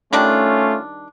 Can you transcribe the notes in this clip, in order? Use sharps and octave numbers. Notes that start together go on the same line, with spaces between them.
D#3 G3 A3 C#4 D4 F4